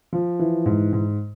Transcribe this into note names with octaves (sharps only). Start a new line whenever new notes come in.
F3
E3
G#2
G#2